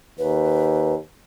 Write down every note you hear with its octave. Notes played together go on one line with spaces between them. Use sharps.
D#2 B4